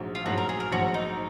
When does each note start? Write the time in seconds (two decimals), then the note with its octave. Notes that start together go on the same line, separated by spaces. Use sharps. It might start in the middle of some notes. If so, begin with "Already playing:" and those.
Already playing: A#1 G#2 F#3
0.15 F4
0.26 A#1 G#2 F#3 F#4
0.38 A#4
0.49 G#4
0.60 A#4
0.72 A#1 G#2 F#3 F#4
0.94 D#4